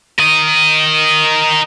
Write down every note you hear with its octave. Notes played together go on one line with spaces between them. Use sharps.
A#4 D#5